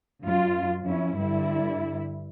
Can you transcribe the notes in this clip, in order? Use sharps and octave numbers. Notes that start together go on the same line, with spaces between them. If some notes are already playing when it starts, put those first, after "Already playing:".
F#2 F4
F2 C#4 E4
G2 D3 G3 E4